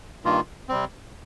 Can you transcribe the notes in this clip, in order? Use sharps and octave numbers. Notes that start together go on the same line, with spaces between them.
G2 D#3 A#3 F4
C3 G3 C4